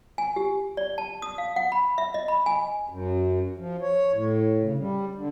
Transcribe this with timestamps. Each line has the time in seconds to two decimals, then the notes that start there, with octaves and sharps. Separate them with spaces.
0.18 G#5
0.36 G4
0.77 D5
0.98 A5
1.22 D#6
1.38 F5
1.56 F#5
1.72 B5
1.98 E5
2.14 D#5
2.28 B5
2.46 G#5
2.89 F#2
3.58 F3
3.81 C#5
4.13 A2
4.62 C#3
4.78 G3
5.15 D3